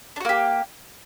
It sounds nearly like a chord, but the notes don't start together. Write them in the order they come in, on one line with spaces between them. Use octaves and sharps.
D4 F#4 A#3 G4